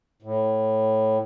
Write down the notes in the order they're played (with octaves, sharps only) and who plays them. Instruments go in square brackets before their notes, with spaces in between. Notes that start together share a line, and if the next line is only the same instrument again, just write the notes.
[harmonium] A2